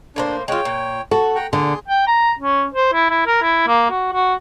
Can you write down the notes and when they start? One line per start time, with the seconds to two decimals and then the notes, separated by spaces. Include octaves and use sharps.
0.16 A2 A#3 D4 C5
0.48 G#3 F4 C#5 G5
0.65 A#2
1.11 F#4 A4
1.35 F#5 G5 A#5
1.53 A#2 D3 G#4 C6
1.88 G5
2.07 A#5
2.39 C#4
2.74 C5
2.93 E4
3.10 E4
3.27 A#4
3.42 E4
3.67 A#3
3.90 F#4
4.13 F#4